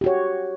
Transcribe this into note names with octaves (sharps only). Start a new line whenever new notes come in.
F#4 G4 C#5